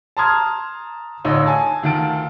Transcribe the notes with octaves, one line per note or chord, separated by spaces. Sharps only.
A5 A#5 C6 D#6 F6 G#6
A1 D3 D#4 F4 C#5 E6
G#5 A5
D2 D#3 F4 A5 D7